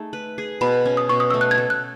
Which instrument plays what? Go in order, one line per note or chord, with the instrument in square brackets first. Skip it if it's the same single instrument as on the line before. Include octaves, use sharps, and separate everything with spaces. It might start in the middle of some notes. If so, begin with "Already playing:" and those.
Already playing: [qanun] A3 D#4 G#4
B4
G#4
[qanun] B2 [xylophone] B5
[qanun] C#4
[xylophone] D#6
[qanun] B2 [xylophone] C#6
[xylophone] D#6
[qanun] A3 [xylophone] E6
[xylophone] F#6
G#6
[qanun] A3
[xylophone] F#6